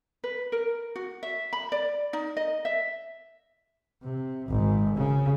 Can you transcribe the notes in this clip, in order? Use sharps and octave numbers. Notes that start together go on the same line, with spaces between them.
B4
A#4
F#4
E5
B5
D5
D#4
D#5
E5
C3
G#1 G#2
C#3